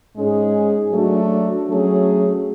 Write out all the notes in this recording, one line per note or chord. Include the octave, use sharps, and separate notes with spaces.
G#2 G#3 C#4 G#4
F#3 A3 D4 F#4
F#3 A3 C#4 G#4